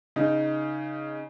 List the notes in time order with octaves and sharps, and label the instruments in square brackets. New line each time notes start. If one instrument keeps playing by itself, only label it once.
[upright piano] C#3 D#4